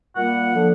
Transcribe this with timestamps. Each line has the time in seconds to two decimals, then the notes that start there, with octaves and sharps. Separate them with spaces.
0.16 A#2 G3 A#3 F#5
0.53 D3 F3 A#3